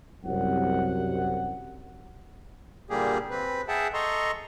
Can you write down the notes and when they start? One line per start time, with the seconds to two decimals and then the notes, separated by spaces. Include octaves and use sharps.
0.25 C2 F#2 F#5
2.90 A#2 D3 G3 A#3 G4 G#4
3.31 C4 B4
3.68 G#4 E5 F#5 G5 A5
3.94 A4 D#5 A#5 C6 C#6